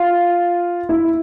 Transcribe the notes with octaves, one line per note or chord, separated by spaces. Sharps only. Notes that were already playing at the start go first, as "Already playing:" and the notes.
Already playing: F4
E4